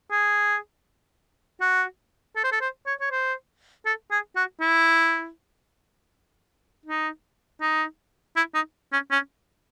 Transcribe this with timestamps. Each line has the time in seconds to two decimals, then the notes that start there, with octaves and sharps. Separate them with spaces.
0.11 G#4
1.61 F#4
2.36 A4
2.44 C5
2.52 A4
2.61 C5
2.86 C#5
3.01 C#5
3.11 C5
3.85 A4
4.11 G#4
4.36 F#4
4.61 E4
6.86 D#4
7.61 D#4
8.36 E4
8.54 D#4
8.92 C#4
9.11 C#4